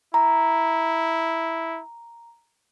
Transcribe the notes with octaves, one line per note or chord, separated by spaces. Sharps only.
E4 A#5